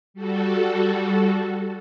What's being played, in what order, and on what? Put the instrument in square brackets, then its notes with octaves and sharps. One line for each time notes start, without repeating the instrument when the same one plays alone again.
[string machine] G3 F#4 A4